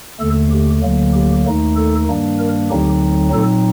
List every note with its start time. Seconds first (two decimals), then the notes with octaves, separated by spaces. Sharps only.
0.20 D#2 D3 A3 A4
0.51 G4
0.83 D2 D3 F#3 A#3
1.14 G4
1.46 D#2 D#3 A3 D#4
1.76 A4
2.08 G2 D#3 G3 A#3 D4
2.39 A#4
2.70 D2 D3 F#3 C4 D#4 G4
3.33 A#2 F#3 C4 D#4 A4